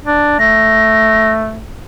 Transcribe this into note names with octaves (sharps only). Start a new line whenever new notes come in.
D4
A3 A#6